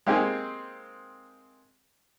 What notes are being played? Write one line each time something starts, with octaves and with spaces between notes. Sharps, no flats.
G#3 A#3 C4 D#4 G4 G#4